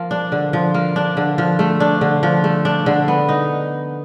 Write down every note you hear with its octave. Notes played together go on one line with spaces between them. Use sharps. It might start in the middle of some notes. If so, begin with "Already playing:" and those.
Already playing: F3 A#3
D4
D3
F3
A#3
D4
D3
F3
A3
D4
D3
F3
A3
D4
D3
B3
D#4